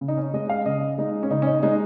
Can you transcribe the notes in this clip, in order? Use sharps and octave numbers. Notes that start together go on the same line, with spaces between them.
C#3
D#4
C#4
G#3 D#5
F5
C#3 D#5
G#3 D#4
C#4
C#3 D#4
C#4
D#4
G#3 D#4